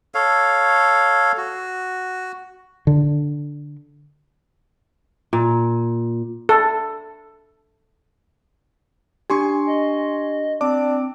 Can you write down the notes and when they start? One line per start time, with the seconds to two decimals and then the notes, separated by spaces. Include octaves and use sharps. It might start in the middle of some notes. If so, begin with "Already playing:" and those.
0.15 A4 C#5 F5
1.38 F#4
2.87 D3
5.33 A#2
6.49 A4
9.30 D4 G4 G#5 C6 C#6
9.67 D#5
10.61 C4 D4 D6